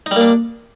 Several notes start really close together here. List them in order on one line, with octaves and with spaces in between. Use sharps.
D#4 G3 A#3 D4